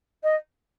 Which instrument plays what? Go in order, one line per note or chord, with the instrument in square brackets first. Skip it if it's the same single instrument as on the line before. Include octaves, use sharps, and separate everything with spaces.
[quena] D#5